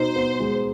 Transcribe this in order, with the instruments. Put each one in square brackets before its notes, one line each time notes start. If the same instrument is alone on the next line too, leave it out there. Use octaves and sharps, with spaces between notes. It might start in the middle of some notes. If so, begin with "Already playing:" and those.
Already playing: [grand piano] B2 D#4 [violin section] C5
[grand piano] B3
G#3